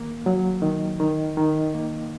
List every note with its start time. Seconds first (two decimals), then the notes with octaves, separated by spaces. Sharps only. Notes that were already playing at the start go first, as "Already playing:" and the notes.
Already playing: D#3 A#3
0.26 F#3
0.62 D#3
1.00 D#3
1.37 D#3
1.74 A#3